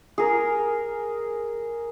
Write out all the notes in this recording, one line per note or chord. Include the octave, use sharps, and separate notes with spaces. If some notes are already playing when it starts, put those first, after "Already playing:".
G#4 A#4